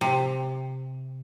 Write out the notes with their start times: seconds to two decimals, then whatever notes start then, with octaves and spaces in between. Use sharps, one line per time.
0.01 C3